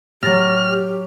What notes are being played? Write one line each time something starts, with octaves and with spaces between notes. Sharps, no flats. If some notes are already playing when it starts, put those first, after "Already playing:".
A2 F#3 G4 F6 A6 A#6